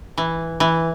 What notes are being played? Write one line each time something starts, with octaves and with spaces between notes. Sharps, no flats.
E3
E3